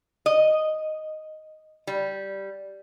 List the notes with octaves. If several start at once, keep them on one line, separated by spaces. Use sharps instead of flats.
D#5
G3